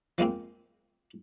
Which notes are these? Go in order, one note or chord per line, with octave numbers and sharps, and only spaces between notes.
F3 G#3 A#3 C4